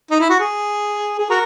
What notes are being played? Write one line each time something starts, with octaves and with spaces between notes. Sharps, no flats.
D#4
E4
F#4
G#4
G#4
F#4 A#4